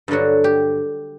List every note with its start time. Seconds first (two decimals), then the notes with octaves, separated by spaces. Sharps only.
0.08 G2 D3 F#3 F#4
0.44 G4